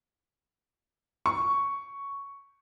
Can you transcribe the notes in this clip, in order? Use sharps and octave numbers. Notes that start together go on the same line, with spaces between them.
C#6